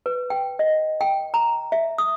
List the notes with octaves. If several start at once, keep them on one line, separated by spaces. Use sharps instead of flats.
B4
G5
D#5
G5
A#5
E5
D#6